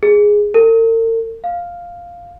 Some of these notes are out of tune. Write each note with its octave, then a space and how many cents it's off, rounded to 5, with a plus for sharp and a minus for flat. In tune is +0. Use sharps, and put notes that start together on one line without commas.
G#4 +0
A#4 -45
F5 +0